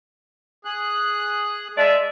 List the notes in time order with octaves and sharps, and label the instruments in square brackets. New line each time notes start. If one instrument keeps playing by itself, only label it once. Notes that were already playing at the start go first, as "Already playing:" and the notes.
[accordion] G#4 F#6
[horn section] G#3 D5 E5